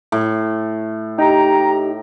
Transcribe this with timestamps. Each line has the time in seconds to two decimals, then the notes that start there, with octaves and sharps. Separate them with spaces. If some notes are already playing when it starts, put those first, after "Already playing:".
0.12 A2
1.18 D#4 G4 G5 A#5